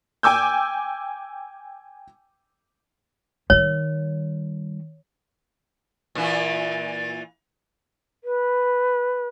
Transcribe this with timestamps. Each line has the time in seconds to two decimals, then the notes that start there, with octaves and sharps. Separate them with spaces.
0.23 G5 G#5 D6 E6 G6
3.50 D#3 G3 C#5
6.15 A#2 E3 E4
8.24 B4